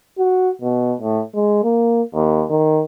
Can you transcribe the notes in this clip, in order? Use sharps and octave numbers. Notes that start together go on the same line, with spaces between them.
F#4
B2
A2
G#3
A#3
D#2
D#3